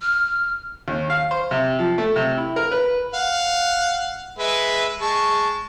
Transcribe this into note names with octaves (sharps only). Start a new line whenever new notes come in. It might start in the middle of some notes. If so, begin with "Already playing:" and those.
F6
D#2
F5
C5
C3
F3
A3
C3
E4
A#4
B4
F5 F#5
G#3 B4 E5
G#3 A5 C#6